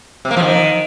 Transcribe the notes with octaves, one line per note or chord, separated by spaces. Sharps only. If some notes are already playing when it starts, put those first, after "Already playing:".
C3
A#3
F3
D#3